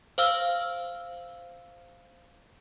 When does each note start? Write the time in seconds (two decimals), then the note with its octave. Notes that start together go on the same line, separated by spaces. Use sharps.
0.18 C5 F5 E6 F6